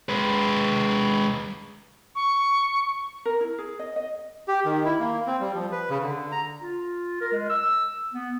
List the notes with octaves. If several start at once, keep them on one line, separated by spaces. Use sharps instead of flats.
G#3 B4
C#6
A#4
E4
G#4
D#5
D#5
G4
D#3
E4
A#3
C4
G3
F3
B4
C#3
D3
A#5
F4
A#4
G#3
E6
B3